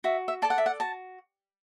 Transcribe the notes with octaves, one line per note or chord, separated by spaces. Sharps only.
F#4 E5
E5
A4 D5 A5
F#5
E5
F#5
F#4 A5